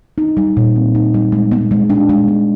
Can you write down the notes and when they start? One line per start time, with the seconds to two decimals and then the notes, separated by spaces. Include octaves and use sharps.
0.18 D#4
0.37 G3
0.57 A#2
0.76 C4
0.95 D#4
1.14 G3
1.32 G#3
1.52 B3
1.71 G#3
1.90 D4
2.09 G#3
2.28 B3